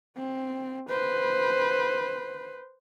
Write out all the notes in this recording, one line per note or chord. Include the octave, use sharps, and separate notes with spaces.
C4
B4 C5